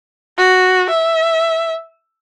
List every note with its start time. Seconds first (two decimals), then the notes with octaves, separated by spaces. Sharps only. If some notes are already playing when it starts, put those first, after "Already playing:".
0.38 F#4
0.90 E5